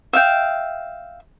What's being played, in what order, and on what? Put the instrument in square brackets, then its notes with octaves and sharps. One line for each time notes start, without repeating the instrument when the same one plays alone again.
[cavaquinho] E5 F5 G5